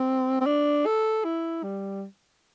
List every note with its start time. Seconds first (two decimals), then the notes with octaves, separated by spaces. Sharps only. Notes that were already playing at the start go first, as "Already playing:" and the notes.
Already playing: C4
0.41 C4
0.46 D4
0.86 A4
1.24 E4
1.63 G3